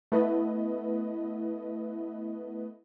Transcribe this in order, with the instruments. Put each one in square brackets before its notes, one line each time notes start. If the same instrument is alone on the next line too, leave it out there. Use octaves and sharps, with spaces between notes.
[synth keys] A3 B3 E4 B4 D#5